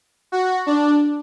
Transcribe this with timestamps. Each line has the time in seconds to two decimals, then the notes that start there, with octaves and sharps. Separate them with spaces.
0.32 F#4
0.66 D4